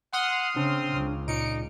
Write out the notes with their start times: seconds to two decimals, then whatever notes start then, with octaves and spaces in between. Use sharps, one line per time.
0.13 F#5 C6 D#6 F6
0.56 C#3 C4 D4
0.90 C#2 C#3
1.28 A#2 D#4 C#7 D7